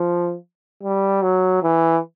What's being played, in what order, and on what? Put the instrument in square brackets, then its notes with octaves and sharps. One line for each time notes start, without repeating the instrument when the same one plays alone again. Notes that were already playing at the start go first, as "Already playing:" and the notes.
Already playing: [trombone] F3
G3
F#3
E3